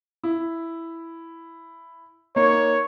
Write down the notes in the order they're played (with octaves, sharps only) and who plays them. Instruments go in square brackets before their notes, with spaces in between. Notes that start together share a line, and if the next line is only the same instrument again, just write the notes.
[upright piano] E4
[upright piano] A#3 D#4 [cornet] C#5